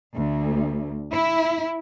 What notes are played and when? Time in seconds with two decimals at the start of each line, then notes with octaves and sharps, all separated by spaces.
0.14 D2
1.11 E4